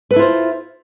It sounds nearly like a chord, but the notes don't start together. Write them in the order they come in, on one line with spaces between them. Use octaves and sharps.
B4 A4 E4 F4 C5